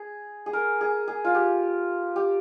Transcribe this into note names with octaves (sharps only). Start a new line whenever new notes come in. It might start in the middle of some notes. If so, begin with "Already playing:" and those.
Already playing: G#4
G#4
A#4
G#4
G#4
F4
G4
G4